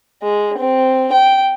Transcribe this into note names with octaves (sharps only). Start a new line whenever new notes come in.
G#3
C4
G5